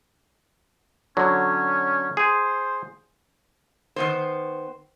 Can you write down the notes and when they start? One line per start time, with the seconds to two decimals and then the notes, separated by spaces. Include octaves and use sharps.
1.17 D3 F#3 C#4
2.17 G#4 C5
3.96 D#3 B3 C5